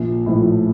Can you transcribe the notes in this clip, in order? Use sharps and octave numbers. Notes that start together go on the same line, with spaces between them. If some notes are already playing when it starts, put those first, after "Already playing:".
Already playing: A#1
A2 F3